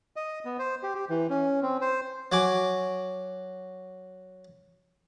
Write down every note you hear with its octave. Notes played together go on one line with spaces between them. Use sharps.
D#5
B3
C5
G4
G4
E3
C#4
C4
C5
F#3 F#4 G#5 D6